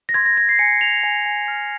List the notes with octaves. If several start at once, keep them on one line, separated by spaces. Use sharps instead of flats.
A#6
C6 G#6
A#6
C6 A#6
C7
G#5 C#7
G#5 F7
G#5
G#5
F6